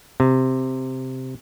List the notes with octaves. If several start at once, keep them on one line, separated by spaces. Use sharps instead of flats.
C3